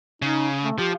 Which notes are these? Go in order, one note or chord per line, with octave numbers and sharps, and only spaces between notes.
C#3 D#4
A3
F3 G4